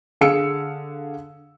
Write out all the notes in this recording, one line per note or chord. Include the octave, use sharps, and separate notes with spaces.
D3 G#4 F5 E6 C#7